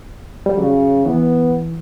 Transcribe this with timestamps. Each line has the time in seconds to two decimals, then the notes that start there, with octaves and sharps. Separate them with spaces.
0.46 G3
0.57 C#3 F#3
1.06 E3 B3